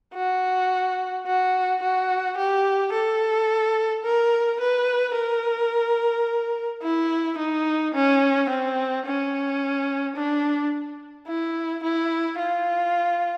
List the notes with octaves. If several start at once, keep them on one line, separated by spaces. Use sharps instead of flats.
F#4
F#4
F#4
G4
A4
A#4
B4
A#4
E4
D#4
C#4
C4
C#4
D4
E4
E4
F4